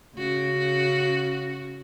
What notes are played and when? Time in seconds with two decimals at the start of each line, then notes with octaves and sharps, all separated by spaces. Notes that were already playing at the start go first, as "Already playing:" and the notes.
0.16 C#3 F#4